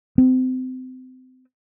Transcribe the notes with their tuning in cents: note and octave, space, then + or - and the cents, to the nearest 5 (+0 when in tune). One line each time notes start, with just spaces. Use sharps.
C4 -30